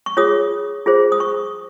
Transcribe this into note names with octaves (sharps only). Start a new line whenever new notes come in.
C#6
F4 G#4 C#5 D#6
F4 G#4 C5
D#6
C#6